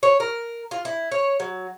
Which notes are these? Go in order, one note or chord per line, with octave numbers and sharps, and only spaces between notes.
C#5
A#4
F4
E4
C#5
F#3